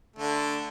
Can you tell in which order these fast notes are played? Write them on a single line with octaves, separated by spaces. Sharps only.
A3 D3 D4